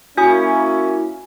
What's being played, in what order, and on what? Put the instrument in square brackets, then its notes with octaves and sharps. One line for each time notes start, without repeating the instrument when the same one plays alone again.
[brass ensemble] A#3 C#4 E4 [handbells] F#4 G#5 D#6